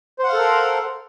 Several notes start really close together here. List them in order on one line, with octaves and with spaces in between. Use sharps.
C5 F#5 F5 A4 A#4